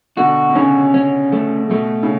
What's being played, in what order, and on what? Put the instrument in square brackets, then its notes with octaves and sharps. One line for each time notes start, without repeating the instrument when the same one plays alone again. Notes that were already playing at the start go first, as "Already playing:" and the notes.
[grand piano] B2 D3 [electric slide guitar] F#4
[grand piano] B2
[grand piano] C#3 [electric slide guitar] C#4
[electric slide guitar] C#4
A3
[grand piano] B2 [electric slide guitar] A3
[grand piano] C#3